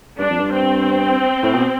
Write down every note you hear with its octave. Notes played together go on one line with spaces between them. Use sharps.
G2 D4
F2
G2
C4
A2
B2